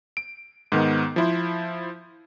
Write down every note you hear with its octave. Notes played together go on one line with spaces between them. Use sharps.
D7
G#2 D#3 B3
F3 E4 C5